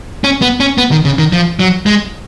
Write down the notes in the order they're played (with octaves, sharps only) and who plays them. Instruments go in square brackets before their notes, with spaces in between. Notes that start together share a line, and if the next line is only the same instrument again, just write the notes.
[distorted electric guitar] C#4
B3
C#4
B3
D#3
C#3
D#3
F3
F#3
G#3